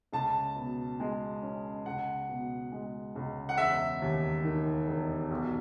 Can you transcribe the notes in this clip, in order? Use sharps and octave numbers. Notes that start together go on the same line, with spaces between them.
C#2 A5
B2
G#3
C#4
C#2 F#5
B2
G#3
C#2
F#5
E1 E5
D#2
D#3
E1
B1